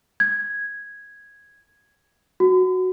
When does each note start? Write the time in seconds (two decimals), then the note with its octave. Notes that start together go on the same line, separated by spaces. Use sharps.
0.20 G#6
2.40 F#4